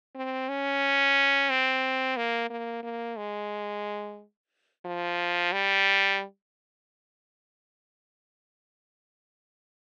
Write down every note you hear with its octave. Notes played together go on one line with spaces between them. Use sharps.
C4
C#4
C4
A#3
A#3
A#3
G#3
F3
G3